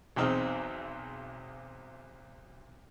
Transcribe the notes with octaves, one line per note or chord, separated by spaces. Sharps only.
B1 E2 C4 D#4 G#4 F6